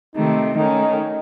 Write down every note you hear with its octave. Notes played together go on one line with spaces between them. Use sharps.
C3 D#3 A3 D#4
D#3 A3 C#4 D#4